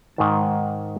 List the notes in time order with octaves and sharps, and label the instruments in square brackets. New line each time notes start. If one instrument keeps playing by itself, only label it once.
[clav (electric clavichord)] G#2 D#3 A5